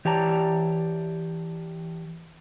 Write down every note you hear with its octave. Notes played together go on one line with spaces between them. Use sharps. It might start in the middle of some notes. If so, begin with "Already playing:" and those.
E3 G4 C#5 D5 A5 A#5